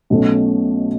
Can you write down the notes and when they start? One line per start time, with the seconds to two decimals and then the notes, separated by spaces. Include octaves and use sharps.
0.10 B1 B2 A3 C#4